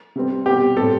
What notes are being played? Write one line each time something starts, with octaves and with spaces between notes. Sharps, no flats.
C3 G3 C4
B2 G3 C4 G4
A2 G3 C4 A4